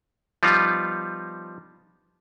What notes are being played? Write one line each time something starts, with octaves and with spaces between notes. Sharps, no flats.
F3 G3 B3 D#4 F4